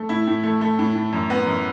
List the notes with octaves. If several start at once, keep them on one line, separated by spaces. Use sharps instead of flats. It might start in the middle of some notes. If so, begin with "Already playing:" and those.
Already playing: A3
A2 E4
A2
A3
A3
A2
A2
F#2
B3
F#2